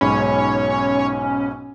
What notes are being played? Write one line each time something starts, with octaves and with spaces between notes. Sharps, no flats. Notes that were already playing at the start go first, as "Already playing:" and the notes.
B1 G#2 C#4 C#5 B5